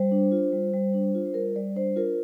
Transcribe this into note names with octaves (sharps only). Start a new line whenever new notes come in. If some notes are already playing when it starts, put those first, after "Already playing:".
Already playing: G3 C5
D4
F4
G3
G3
D4
F4
C5
G3 A#4
G3 D5
D4 C5
F4 A#4